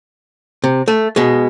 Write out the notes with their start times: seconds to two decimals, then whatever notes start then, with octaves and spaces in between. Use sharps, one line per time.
0.64 C3
0.88 A3
1.16 B2 G#3